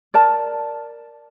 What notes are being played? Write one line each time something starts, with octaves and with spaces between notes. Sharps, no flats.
A#4 D5 A5